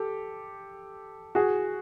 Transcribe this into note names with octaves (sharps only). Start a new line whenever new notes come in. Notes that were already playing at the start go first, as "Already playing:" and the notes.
Already playing: G4 A4
F#4 G#4